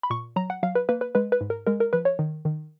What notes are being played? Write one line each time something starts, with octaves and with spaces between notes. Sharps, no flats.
B5
A#2 C#6
F#3 A#5
F#5
F#3 F5
B4
A#3 B4
B4
G#3 B4
B4
G#2
A#4
G#3 A#4
A#4
F3 B4
C#5
D#3
D#3